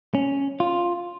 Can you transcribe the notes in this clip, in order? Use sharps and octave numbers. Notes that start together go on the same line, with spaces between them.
C#4
F4